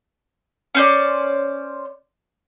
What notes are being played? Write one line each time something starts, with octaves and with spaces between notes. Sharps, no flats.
C#4 C5 D5